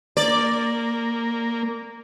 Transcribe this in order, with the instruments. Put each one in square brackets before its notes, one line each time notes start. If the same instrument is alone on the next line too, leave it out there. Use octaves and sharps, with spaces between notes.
[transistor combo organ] A#3 [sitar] D5